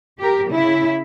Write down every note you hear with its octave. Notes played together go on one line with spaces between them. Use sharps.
G4 A#4
C#3 E4